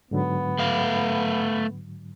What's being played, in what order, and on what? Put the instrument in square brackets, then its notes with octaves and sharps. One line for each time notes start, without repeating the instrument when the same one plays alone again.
[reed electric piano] G#2 D3 F#3 [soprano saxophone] B3
[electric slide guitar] A3 F5